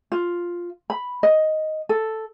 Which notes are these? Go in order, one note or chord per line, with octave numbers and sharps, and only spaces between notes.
F4
B5
D#5
A4